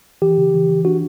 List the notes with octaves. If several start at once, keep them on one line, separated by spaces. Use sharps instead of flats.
E3 G4
C#3
E3
E3
D4 F#4